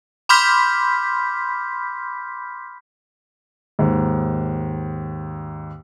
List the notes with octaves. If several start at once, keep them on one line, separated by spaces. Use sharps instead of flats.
B5 C6 D6 F6 G6 B6
D#2 G#2